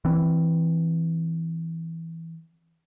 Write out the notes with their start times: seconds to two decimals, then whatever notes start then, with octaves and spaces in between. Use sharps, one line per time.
0.05 E3 C4